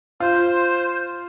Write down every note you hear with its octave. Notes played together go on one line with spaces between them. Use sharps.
F4 C5